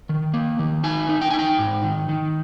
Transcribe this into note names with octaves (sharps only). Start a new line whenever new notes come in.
D#3
A#3
D#3
D#4 G#5
D#4
G5
G#5
D#4
G5
G#2
D#3
D#3